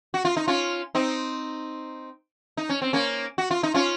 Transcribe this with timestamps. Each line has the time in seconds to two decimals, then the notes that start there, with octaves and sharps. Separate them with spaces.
0.14 F#4
0.25 F4
0.37 D#4
0.48 C#4 F4
0.95 C4 D#4
2.57 D#4
2.69 C#4
2.82 C4
2.93 A#3 C#4
3.38 F#4
3.51 F4
3.63 D#4
3.74 C#4 F4